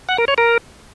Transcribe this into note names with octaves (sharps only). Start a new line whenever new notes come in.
F#5
A#4
C#5
A#4